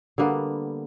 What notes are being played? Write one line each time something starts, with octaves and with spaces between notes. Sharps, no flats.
D3 G3 A#3 B3